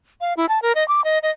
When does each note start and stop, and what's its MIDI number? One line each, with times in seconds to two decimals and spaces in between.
0.21 0.34 77
0.37 0.46 64
0.49 0.61 81
0.62 0.73 70
0.75 0.86 75
0.88 1.04 86
1.04 1.18 75
1.23 1.31 75